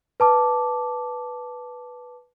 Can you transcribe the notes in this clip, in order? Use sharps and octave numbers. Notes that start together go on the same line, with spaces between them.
B4 A5 D6